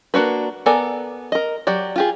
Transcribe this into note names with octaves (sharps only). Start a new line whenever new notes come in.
A#3 D4 F#4 B4
B3 A4 A#4 D5 G#5
A#4 D#5
F#3 G4 D5
F4 G4 G#4